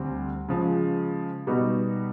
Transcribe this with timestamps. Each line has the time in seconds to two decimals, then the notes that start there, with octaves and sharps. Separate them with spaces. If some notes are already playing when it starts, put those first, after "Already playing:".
Already playing: D2 D3 G3 C4
0.48 C#3 F3 G#3
1.47 B2 G3 B3 D#4 F#4